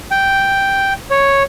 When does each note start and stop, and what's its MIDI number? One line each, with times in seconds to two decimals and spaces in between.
0.11 0.93 79
1.11 1.43 73